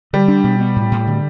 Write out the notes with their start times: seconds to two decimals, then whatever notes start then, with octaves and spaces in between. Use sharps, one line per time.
0.13 D3 G3
0.28 D4
0.44 B2
0.60 B3
0.76 A2
0.92 A2
1.07 D3